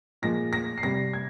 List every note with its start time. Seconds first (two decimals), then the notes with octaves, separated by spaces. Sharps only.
0.22 A#2 F3 G#3 A#6
0.53 A#6
0.78 C7
0.83 C3 G3 A#6
1.13 G#6